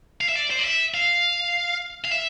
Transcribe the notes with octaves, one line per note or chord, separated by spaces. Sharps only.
F5
E5
D5
C5
D5
E5
F5
F5
E5